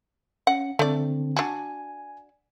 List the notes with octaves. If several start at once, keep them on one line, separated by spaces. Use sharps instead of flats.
C#4 F#5
D3 A3 C4 D5
D4 F#4 G#5